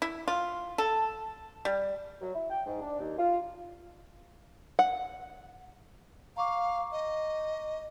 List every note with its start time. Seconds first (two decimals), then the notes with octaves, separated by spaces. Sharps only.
0.02 E4
0.28 F4
0.78 A4
1.65 G3
2.20 F#3
2.34 E4
2.50 G5
2.66 G#2
2.81 D4
2.99 D#2
3.17 F4
4.79 F#5
6.37 F5 A#5 C#6 D6
6.92 D#5